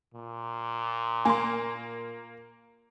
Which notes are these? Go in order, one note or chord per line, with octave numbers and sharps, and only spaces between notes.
A#2
A#3 G#5 C6